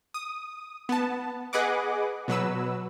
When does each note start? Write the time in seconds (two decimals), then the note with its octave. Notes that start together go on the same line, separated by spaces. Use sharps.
0.14 D#6
0.89 B3 A5
1.53 G#4 B4 D#5 F#5 D6
2.28 B2 F#3 B4 E6